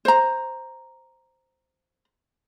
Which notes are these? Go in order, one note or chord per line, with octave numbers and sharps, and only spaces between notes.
C5 A#5